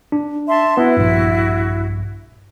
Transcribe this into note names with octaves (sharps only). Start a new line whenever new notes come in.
D4
E5 A5 C6
B3 E4 F#4
A#1 G2